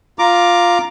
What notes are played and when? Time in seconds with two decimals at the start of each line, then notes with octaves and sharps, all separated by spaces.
0.19 F4 A#5 D6